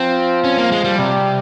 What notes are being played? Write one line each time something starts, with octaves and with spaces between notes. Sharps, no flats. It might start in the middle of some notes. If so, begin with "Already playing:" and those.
Already playing: F3 C4
C#4
A#3
G#3
G3
C3 G3